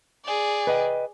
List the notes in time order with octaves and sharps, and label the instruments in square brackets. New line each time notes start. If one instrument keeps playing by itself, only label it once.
[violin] G#4 D5
[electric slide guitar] B4 D#5 G5